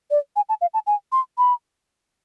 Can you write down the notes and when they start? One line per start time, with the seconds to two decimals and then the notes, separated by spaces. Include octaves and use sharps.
0.11 D5
0.36 G#5
0.49 A5
0.61 F5
0.74 A5
0.87 G#5
1.12 C6
1.38 B5